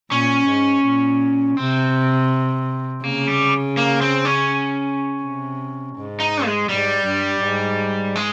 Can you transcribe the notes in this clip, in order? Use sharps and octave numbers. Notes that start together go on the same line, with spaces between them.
A#2 C#4
G#2
A#2
C3 C4
C#3 A#3
G3
A#3
C4
C#4
C3
G#2
D#4
G#3
G#2 G3
G2
G#2
G#3